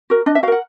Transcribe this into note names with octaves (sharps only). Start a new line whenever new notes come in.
F#4 A#4
D4 D#5
E5
F#4 A#4 F5 F#5